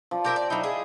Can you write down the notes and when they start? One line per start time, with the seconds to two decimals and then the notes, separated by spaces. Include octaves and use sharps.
0.11 F3 D5
0.24 G4 A#4 C5 E5 G5
0.36 D5
0.50 F#3 D#4 E4 B5 D6
0.63 G#4 D#5 A5